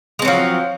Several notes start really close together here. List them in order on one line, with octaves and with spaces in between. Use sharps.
G#3 C4 F#3 F3